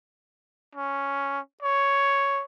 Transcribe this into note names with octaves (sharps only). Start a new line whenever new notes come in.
C#4
C#5